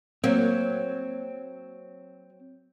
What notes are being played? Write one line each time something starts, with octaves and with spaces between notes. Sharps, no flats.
F#3 A#3 C4